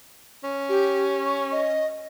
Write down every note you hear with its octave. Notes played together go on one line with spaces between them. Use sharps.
C#4
G4
C#6
D#5